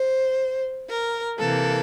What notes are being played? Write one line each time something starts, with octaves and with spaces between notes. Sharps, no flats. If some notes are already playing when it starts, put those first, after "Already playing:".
Already playing: C5
A#4
C3 E3 A#3 A4